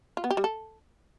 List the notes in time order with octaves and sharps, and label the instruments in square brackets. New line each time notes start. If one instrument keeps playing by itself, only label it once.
[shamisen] F4
B3
G4
G3
A4